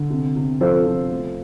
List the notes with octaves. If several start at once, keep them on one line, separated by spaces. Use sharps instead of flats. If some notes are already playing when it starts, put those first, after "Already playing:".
Already playing: D3
C3
C3
F3 A4 C5
F3
A3